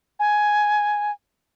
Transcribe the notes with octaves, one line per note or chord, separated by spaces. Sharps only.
G#5